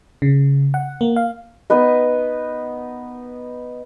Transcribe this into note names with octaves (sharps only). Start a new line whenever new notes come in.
C#3
F#5
A#3
F5
B3 D#4 B4 D#5